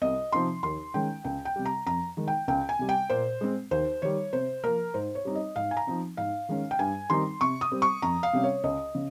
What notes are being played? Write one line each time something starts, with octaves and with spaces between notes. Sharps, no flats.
C2 D#5
C3 F3 C4 D#4 C6
D#2 C6
D#3 G#3 C#4 G5
C#2 G5
G5
C3 G3
A#5
F2 A#5
D#3 G#3
G5
C#2 G5
G#5
C3 G3
G5
A#2 C5
G#3 C4
D#2 C5
D#3 G3 C#5
C3 C5
F3 A#3 A#4
G#2 C5
C#5
G3 C4 D#4
D#5
G#2 F5
G#5
A#5
F3 C4 D#4
G#2 F5
D#3 G#3 C#4
G5
G2 G#5
D#3 G3 C4 D#4 C6
C3 C#6
D#6
G3 C4
C#6
F2 A#5
F5
C3 G3 C#4
C#5
C#2 D#5
C#3